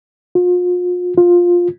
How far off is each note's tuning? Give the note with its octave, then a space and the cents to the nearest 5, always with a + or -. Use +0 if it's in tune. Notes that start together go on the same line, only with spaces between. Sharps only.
F4 +40
F4 +10